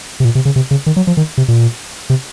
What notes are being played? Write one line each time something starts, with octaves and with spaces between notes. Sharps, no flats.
C3
A#2
C3
C#3
C3
C#3
D#3
F#3
F3
D#3
C3
A#2
C3